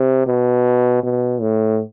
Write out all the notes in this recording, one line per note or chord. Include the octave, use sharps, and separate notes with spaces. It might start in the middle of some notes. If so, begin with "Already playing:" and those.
Already playing: C3
B2
B2
A2